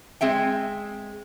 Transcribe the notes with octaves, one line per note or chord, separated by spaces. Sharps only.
G#3 C4 E5 G5